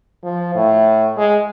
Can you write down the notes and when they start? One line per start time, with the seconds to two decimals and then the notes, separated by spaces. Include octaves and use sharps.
0.24 F3
0.55 A2
1.18 G#3